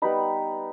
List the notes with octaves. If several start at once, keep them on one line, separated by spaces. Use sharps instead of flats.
G3 B3 D#4 B5